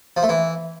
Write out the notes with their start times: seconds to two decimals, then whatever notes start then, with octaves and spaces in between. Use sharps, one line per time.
0.17 F3
0.23 A3
0.29 E3